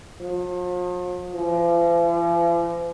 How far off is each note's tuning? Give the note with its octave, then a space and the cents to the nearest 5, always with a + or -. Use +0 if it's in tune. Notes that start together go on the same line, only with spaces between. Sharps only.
F3 +45
F3 -45